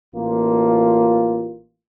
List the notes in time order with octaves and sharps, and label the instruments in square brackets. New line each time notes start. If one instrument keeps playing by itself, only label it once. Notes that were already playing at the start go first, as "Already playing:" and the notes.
[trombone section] A1 A#3 F4